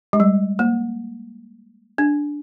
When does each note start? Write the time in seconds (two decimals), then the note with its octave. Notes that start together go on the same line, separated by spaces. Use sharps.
0.13 G#3
0.20 G3
0.59 A#3
1.98 D4